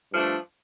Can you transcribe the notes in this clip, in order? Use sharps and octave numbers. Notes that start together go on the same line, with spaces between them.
G2 F3 A3 D4